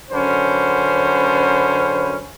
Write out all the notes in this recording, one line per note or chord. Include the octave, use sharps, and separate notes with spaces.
F#2 D3 C#4 B4 C5